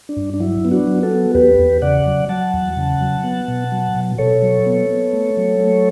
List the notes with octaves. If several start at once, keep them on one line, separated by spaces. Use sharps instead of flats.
D4
G2
D4
F#3 E4
B3
D4 F#4
F#3
F#4 A4
B3
E2 G4 B4
E2
C#3 D5 F#5
F#3
F#3 F#5 A5
E2
C#3
F#3
B3
B2
F#3
B2
B2 A4 C#5
F#3
B3
B3
A3
F#3
A3